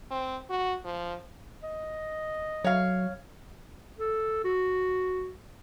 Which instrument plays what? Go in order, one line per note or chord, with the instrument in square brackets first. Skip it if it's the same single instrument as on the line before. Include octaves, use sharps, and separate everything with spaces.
[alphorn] C4
F#4
F3
[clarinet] D#5
[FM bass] F#3 [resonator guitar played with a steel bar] C#5 F5
[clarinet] A4
F#4